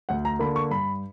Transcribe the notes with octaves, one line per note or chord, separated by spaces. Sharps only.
D2 F#5
A#5
D3 A#3 B5
C#6
G2 B5